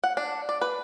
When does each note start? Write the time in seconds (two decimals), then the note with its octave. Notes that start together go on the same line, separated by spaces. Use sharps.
0.04 F#5
0.17 D4
0.49 D5
0.61 B4